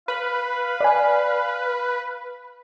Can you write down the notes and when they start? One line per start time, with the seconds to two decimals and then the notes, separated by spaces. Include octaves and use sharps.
0.08 B4 F5
0.81 D5 G#5